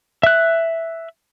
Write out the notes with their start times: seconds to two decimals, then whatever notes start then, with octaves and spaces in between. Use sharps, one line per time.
0.23 E5 F#6